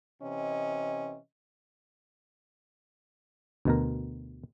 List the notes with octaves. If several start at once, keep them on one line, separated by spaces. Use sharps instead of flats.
C3 E3 C#4 D#5
D2 B2 A#4